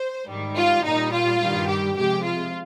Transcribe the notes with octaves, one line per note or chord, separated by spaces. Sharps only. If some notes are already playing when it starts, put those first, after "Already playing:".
Already playing: C5
G#2 D#3 G3
F4
A#2 G3 D#4
F4
G2 D#3 G3
G4
C3 F3 G#3 G4
F4